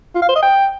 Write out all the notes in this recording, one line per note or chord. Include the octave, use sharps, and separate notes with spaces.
F4
F5
C5
D#5
G5